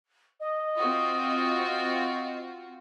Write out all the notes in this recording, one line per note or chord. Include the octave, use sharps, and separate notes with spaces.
D#5
C4 F4 F#4